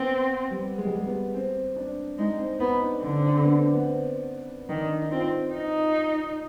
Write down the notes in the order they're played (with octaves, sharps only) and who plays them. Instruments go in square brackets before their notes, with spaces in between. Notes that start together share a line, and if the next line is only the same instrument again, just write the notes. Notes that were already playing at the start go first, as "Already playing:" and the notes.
Already playing: [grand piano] B3 [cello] C4
[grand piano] G3
G#3
G3
G#3
B3
C4
D4
[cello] G#3 [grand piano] D#4
[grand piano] C4
[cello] B3 [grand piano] D#4
[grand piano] D4
[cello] D3 [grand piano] C4
[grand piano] D4
C4
D4
C4
B3
B3
C4
[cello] D#3 [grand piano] D4
[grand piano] D#4
[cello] C4 [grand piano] F4
[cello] D#4